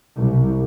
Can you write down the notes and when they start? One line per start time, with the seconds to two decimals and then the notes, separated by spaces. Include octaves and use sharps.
0.17 C2